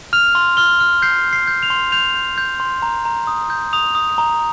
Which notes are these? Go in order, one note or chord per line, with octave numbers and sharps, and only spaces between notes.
F6 F7
C6
F6 G7
F6
G6 C7
G6
C7
G6
F7
C6
G6 F7
G6
G6
C6
A#5
A#5
D#6
G6
D#6 F7
D#6
A#5